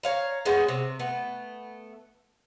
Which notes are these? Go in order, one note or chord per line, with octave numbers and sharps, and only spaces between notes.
C#5 F5 A#5
G#3 B3 C#4 F#4
C3
A3 B3